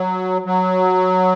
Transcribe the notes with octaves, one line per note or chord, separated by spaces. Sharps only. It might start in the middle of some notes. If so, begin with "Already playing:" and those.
Already playing: F#3
F#3